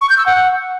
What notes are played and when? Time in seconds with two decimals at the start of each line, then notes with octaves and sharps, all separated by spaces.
0.01 C#6
0.10 G6
0.18 E6
0.26 F#5